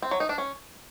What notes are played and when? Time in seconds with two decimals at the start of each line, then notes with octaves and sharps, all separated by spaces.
0.02 C4
0.11 F#3
0.20 D#4
0.29 D4
0.38 C#4